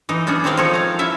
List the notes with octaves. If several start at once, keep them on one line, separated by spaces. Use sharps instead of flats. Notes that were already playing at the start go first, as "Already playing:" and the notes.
E3 D#4
B3 C#4 D4 F#4 G#4
D#3 C4 G#4 F5 G5
F3 D#4 A4 C#5
F5 A#5
C#4 E4 E5 A5